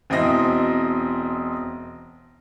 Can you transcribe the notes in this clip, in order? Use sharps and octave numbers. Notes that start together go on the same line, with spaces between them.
E1 C4 E4 D#5 A#6